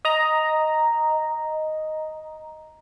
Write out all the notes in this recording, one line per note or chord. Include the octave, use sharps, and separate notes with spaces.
D#5 A#5